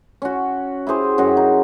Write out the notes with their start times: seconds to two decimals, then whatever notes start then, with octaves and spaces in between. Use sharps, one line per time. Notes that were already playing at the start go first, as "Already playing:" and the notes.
0.22 C#4 F#4
0.87 E4 G4 G#4 C5
1.18 F#2 C#4 F#4
1.37 D#4